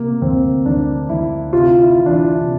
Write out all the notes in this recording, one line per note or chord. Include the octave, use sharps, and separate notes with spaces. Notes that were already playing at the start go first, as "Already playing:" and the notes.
Already playing: C3 A#3
D2 C4
D2 D4
D2 E4
C3 F4
E4
E3
D4
E4
C3